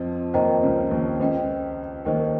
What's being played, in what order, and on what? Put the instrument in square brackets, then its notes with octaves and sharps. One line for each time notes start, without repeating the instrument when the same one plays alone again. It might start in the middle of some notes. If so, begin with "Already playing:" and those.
Already playing: [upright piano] F2 F3 [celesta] C5 D#5
[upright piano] D#2 D#3 [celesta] C5 D#5 G5 A#5
[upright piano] C#2 C#3
D#2 D#3
[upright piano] C#2 C#3 [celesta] C5 D#5 G5
[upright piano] D#2 D#3 [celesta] C5 D#5 G5